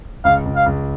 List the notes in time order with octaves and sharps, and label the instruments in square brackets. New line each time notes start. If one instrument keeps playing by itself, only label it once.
[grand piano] C#2 [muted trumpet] F5
[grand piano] C#2
[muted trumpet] F5
[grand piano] C#2